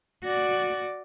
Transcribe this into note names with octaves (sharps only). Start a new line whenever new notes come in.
F#4 D5